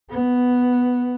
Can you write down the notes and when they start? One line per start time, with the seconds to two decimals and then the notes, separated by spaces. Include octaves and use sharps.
0.10 B3